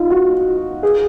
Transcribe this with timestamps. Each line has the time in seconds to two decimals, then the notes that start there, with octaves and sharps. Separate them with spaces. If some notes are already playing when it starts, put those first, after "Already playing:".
Already playing: D#4 F4
0.10 F#4
0.83 G#4